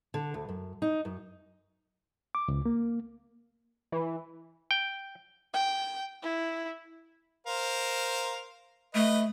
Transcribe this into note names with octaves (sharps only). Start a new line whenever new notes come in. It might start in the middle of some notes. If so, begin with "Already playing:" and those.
D3
D2
F#2
D#4
F#2
D6
C#2
A#3
E3
G5
G5
E4
A#4 C5 F5
A3 B4 D#5